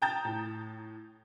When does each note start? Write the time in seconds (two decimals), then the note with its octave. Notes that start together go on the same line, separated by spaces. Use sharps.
0.02 G5 A5 A#5 D#6 G6 A6
0.25 A2